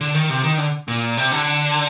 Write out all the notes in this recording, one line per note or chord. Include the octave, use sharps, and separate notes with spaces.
D3
D#3
C3
D#3
D3
A#2
C3
D3